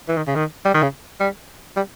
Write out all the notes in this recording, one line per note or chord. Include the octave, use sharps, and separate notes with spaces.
E3
D#3
C#3
D#3
G3
D#3
C#3
G3
G3